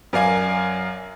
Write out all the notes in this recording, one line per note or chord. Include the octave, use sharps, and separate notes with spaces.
F#2 A#4 D5 F5 G#5